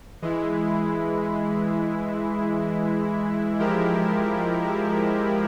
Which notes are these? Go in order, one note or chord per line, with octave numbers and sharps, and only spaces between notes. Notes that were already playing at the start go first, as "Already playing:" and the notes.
E3 G#3 E4
F3 G#3 E4 G4 A#4